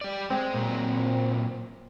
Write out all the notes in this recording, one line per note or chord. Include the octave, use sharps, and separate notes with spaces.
G4 D5
G#3 C4
A#2 F#3